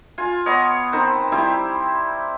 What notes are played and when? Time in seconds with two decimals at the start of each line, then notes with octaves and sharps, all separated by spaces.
0.18 F4 G#5
0.46 B3 C#5 D#5
0.92 D#3 C4 B4
1.32 G3 C4 E4 G4